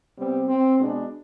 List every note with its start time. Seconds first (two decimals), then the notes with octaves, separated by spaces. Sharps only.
0.18 C3 G3 B3 C4
0.49 C4
0.80 B2 G#3 B3 D4